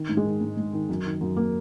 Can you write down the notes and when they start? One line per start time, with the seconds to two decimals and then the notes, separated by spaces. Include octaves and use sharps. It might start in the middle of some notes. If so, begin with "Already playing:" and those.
Already playing: D#3
0.09 G#2
0.17 G#3
0.25 D#3
0.41 G#2
0.57 G#2
0.73 D#3
0.89 F#2
1.05 D#3
1.21 F#2
1.36 A#3